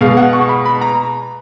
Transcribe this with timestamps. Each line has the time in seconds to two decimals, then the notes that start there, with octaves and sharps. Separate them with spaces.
0.01 B2 G#3 F5
0.17 F#5
0.33 C#6
0.49 B5
0.66 B5
0.81 A#5